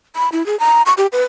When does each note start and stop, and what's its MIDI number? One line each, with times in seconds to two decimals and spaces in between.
0.16 0.29 83
0.32 0.45 64
0.46 0.59 68
0.60 0.82 82
0.86 0.93 85
0.98 1.07 67
1.12 1.23 71